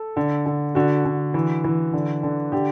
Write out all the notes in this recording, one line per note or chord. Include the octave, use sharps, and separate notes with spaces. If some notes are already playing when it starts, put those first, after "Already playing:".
Already playing: A4
D3
D3
D3 F#4
D3
E3
E3
D3
D3
D3 G4